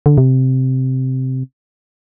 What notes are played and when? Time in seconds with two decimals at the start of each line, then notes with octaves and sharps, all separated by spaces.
0.06 D3
0.18 C3